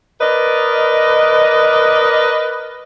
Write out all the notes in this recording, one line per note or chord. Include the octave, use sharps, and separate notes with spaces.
A#4 B4 D5 D#5